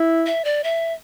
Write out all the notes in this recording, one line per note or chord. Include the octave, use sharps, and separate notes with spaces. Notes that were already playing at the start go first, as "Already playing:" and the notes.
Already playing: E4
E5
D5
E5